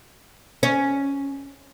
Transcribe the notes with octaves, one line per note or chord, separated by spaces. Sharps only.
C#4